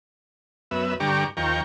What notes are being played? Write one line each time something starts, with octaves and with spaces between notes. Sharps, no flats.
F#2 B3 E5
G2 D3 G4 A#5 C#6 D6
D#2 F3 G5 A#5 C#6